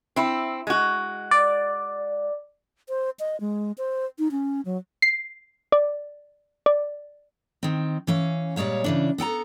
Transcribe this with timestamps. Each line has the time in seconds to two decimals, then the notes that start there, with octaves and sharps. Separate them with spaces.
0.16 C4 E4
0.67 G#3 F#4
1.31 D5
2.89 C5
3.20 D#5
3.41 G#3
3.78 C5
4.19 D#4
4.31 C#4
4.65 F#3
5.02 C7
5.72 D5
6.66 D5
7.63 D#3 C4
8.07 E3 C#4 F5
8.56 A#2 G3 G#3 C#5 F5
8.84 C#3 E3 D4
9.18 B3 A4 G5 A#5